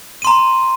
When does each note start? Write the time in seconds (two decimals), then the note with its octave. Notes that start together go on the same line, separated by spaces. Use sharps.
0.22 D#7
0.25 C6
0.27 A#5